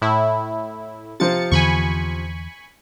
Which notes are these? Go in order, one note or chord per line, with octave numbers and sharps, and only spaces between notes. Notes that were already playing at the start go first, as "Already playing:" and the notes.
A2 E4
C3 F3 C4 A6 C#7
E2 D3 E3 G#5 B5 C#6